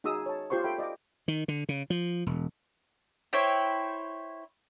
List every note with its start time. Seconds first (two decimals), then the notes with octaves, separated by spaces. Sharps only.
0.04 D#4 F#4 G#4 D#6 E6
0.26 C#5 A5
0.50 F4 G4 C5 C6 C#6
0.64 A4 E5 G5 B5
0.78 D5 D#5 F5 D6
1.28 D#3
1.48 D3
1.69 C#3
1.90 F3
2.26 E1
3.33 E4 C5 C#5 G5